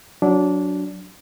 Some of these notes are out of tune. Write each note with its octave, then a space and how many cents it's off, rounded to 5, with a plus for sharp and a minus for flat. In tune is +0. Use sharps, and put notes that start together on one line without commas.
F#3 +0 D4 -15